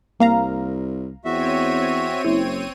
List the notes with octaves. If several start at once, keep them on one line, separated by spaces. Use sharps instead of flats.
C2 A#3 F5 A#5
E2 C4 F#4 C#5 E5 D#7
F#1 E4